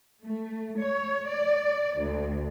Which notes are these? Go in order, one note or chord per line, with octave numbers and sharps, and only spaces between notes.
A3
C#5
D5
D2